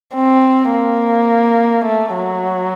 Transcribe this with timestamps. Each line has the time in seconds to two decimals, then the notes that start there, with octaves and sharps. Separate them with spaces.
0.15 C4
0.71 A#3
1.85 A3
2.13 F#3